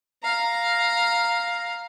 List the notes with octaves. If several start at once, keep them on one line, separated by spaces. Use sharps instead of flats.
F5 A#5